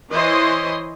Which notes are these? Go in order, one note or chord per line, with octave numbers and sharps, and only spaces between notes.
E3 E4 C5 C#5 D#5 C6